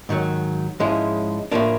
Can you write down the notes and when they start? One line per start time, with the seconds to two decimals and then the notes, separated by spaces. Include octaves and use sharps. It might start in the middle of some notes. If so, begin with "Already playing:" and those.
0.09 G#2 D#3 F#3
0.80 G#2 F3 G#3 C#4 E4
1.52 A2 F3 A#3 D4